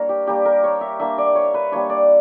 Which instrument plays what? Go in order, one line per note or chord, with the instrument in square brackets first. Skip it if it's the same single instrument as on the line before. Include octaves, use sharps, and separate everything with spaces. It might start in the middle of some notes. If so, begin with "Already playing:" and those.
Already playing: [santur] G3 A#3 D4 A#4 C#5
G4
G3 A#3 D4 G4
A#4
C#5
E5
G3 A#3 D4 E5
D5
C#5
B4
G3 A#3 D4 C#5
D5